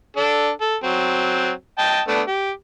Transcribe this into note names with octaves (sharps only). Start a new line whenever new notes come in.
D4 A4
A4
F#3 C4
D#5 G5 A5
A3 B3 D4
G4